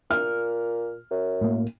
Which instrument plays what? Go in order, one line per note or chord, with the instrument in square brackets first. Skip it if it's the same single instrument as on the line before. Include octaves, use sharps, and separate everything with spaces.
[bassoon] A#2 [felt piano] F6
[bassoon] F#2
[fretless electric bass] A2 A#3